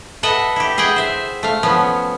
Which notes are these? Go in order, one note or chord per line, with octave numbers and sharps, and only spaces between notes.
A4 B4 D#5 E5 F#5
E4 G4
E4 G#4 D#5 F#5 G5
C5 E5
A3 F5
F3 B3 C#4